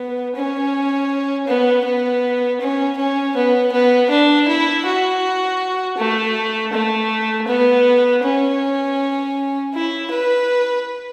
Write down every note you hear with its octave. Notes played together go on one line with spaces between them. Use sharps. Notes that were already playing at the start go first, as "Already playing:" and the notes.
Already playing: B3
C#4
B3
B3
C#4
C#4
B3
B3
D4
E4
F#4
A3
A3
B3
C#4
E4
B4